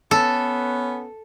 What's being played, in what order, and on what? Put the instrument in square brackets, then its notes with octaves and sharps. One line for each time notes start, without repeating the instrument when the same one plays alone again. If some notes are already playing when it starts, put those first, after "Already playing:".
[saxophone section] B3 C#4 B4 [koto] A4